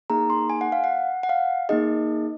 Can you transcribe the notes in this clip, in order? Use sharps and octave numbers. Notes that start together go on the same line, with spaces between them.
A#3 D#4 G#4 A#5
C6
G#5
F#5
F5
F#5
F#5
F5
A#3 D#4 G#4 D#5